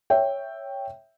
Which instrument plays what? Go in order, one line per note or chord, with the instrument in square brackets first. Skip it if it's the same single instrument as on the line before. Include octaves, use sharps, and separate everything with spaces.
[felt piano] C#5 E5 G5